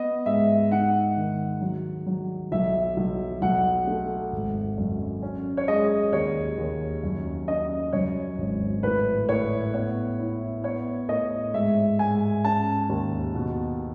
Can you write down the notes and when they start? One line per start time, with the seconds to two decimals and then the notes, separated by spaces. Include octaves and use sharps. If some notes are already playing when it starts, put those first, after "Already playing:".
Already playing: B3 D#5
0.26 G#2 E5
0.71 D#4 F#5
1.16 D#3
1.61 F#3
2.07 F#3
2.52 B1 E5
2.97 B1
3.42 B1 F#5
3.87 A3
4.32 G#1
4.78 F#2
5.22 C#4
5.57 C#5
5.68 G#3 D#5
6.12 D#2 C#5
6.58 D#2
7.03 F#2
7.48 C#4 D#5
7.93 F#2 C#5
8.38 G#1
8.83 A2 B4
9.29 A2 C#5
9.74 B3 C#5
10.19 E4
10.64 B3 C#5
11.09 A2 D#5
11.54 G#2 E5
11.99 G#2 G#5
12.44 C#4 A5
12.89 D#2
13.35 B2